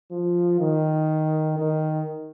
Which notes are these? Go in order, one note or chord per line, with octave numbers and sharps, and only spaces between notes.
F3
D#3
D#3